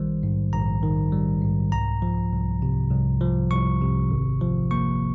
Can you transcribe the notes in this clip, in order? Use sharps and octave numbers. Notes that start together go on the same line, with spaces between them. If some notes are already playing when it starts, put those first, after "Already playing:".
Already playing: A#1 D#3 G3 C5
G#2
A#1 A#5
D#3
G3
G#2
C2 A#5
F3
C2
C3
C2
F3
C2 C#6
C3
G#1
F3
A#3 C#6